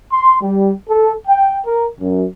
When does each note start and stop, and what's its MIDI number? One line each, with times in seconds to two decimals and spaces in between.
0.11 0.40 84
0.41 0.71 55
0.89 1.13 69
1.28 1.57 79
1.66 1.88 70
2.00 2.25 42